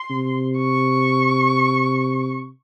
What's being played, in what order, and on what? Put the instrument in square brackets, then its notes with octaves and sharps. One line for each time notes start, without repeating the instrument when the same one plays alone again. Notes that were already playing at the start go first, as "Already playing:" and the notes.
Already playing: [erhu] C6
[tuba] C3
[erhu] C#6